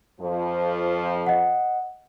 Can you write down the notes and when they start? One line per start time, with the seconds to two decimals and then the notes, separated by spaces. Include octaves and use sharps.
0.21 F2 F3
1.27 D#5 F#5